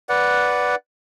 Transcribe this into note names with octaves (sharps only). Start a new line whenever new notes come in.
B4 D5 F#5